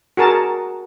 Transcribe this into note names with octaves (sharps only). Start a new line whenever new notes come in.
F#4 G#4 A#4 A5